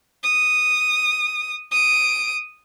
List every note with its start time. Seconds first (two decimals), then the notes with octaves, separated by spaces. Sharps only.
0.23 D#6
1.71 D#6 D7